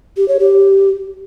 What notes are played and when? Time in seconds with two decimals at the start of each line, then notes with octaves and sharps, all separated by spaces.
0.17 G4
0.28 C#5
0.40 G4